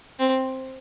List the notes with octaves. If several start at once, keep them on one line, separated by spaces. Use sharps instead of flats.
C4